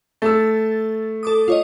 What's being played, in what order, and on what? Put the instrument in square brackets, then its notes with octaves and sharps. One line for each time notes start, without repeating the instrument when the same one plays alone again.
[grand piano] A3 E6 [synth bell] A6
[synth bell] A4 D6 D#6
F4 C#5 D#5